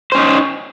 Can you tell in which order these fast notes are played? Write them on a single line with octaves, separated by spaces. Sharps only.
C5 C#4 D#4